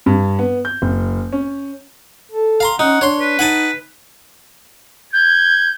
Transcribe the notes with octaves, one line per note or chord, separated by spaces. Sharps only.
G2
B3
G6
F#1
C#4
A4
F5 A#5 C6
C#4 D#4 F#5
D4 C#5 C6
B4
D#4 F#5 G#5 A5
G6 G#6